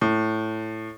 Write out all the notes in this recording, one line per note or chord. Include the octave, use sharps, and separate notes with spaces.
A2